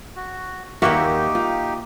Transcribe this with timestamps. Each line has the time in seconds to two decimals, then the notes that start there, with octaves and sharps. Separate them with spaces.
0.16 F#4
0.82 D#2 A#2 A#3 D#4 F#4 G4 E5
1.35 F4